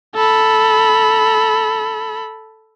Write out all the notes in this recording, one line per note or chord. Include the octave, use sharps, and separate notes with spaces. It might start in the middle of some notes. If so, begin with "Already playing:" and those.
A4 B5